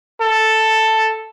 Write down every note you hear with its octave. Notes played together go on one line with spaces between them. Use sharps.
A4